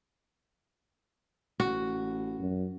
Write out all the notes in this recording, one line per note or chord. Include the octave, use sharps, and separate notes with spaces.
A1 F#4
F#2